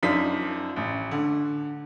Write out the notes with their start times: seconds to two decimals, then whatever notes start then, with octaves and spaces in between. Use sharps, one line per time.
0.03 F#2 F3 D4 D#4 B6
0.76 A1
1.11 D3